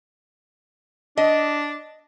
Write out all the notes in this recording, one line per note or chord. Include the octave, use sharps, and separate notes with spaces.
D4 D#5